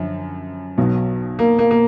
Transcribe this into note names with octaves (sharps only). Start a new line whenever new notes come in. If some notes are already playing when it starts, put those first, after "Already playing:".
Already playing: F#2 D3 F3
B1 B2 F#3
A#3
A#3
A#3